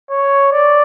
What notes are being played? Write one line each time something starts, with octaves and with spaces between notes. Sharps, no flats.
C#5
D5